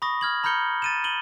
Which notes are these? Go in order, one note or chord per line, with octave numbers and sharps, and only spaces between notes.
B5 C#6 D#6 A#6
F6 G#6 F#7
A#5 B5 F6 G6 C#7 G7
A6 D#7 E7
D#7 F#7 G7